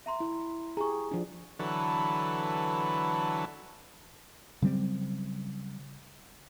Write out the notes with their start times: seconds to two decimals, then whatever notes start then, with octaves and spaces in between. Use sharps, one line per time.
0.06 E5 A#5 C6
0.20 E4
0.77 G4 G#4 A#5 C#6
1.11 F3 D4
1.59 D3 E3 F#3 A4 B4
4.62 C#3 F#3 G3 C4